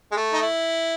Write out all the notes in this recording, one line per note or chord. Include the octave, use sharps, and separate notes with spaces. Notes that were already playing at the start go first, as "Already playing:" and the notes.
G#3
A3
D#4
E4